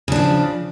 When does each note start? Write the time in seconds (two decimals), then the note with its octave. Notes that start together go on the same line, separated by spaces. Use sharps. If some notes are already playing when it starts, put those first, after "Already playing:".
0.08 C#3
0.12 D4
0.16 F3